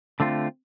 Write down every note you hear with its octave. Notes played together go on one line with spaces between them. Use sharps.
D3 A3 C4 F4